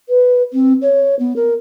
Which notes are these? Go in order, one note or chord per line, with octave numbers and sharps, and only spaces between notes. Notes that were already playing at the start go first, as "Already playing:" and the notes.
B4
C4
C#5
B3
A#4